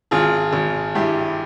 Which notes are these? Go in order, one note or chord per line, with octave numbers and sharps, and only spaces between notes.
G#1 F4 G#4
G#1
G2 E4 G4